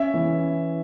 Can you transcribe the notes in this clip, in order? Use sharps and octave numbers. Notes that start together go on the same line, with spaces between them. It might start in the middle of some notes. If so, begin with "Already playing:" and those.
Already playing: C#4 E5
E3